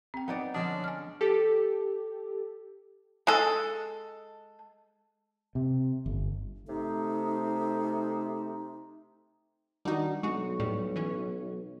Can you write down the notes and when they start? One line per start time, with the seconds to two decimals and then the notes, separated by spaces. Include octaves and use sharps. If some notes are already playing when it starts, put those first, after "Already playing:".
0.14 C4 G5
0.28 B3 D#4 D5
0.54 D3 F3 G#3 C#4 D4 D#6
0.84 G#5 F6
1.21 G4 A4
3.27 G#3 A4
5.55 C3
6.06 G1
6.68 C3 A3 D#4
9.85 D#3 G3 D4 D#4 F#4
10.23 B1 G#3 F#4 C#6
10.59 A2 G3
10.96 E3 C#4